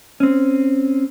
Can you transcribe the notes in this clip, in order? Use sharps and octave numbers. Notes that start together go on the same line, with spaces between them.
C4 C#4